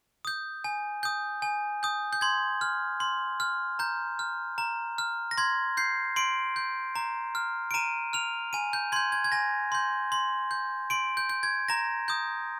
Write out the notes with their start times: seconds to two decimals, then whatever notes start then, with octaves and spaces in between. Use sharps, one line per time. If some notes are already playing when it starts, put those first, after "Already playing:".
0.25 D#6 G6
0.64 G#5
1.03 D#6 G6
1.42 G#5
1.83 D#6 G6
2.13 G6
2.21 C6 G#6
2.61 F6
3.00 C6
3.40 F6
3.79 A#5 G6
4.19 F6
4.58 A#5
4.98 F6
5.31 A#6
5.38 C6 G#6
5.77 G6 C7
6.16 C6 D7
6.56 G6
6.96 A#5
7.35 F6
7.71 D7
7.74 A#5 D#7
8.13 F6 F7
8.53 G#5 D#7
8.73 G6
8.92 C6 G6 G#6
9.12 G#6
9.24 G#6
9.32 G#5 A#6
9.72 C6 G6
10.12 C6
10.51 G6
10.90 C6 D7
11.17 G6
11.29 G6
11.43 G#6
11.68 A#5 A#6
12.08 D#6 G6